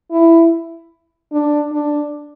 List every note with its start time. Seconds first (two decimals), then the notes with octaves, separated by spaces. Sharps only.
0.11 E4
1.32 D4
1.72 D4